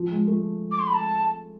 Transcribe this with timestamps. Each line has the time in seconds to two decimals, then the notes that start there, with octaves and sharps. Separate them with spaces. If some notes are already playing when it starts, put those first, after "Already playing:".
Already playing: F3
0.11 G#3
0.28 A3
0.71 D6
0.79 C6
0.87 B5
0.94 A5